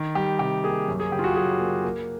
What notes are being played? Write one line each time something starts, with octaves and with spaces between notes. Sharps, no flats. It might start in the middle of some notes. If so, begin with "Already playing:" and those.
Already playing: D#3
G3 G4
C3 G4
A#3 G#4
F#2
G#4
C#3 G4
F4
F#4
F#3 G#4
A#3
A#3